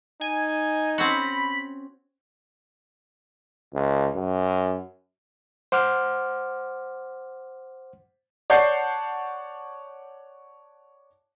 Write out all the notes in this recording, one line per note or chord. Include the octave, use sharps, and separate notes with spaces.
D#4 G#5
C4 C#4 F#4 B5
C#2
F#2
C5 F#5 D6 F6
C#5 D5 F#5 A5 G6 C7